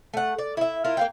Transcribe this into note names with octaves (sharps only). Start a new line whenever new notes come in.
A3 F#5
D5
E4 E5
E4 F4 A#4
A#3 F5 G5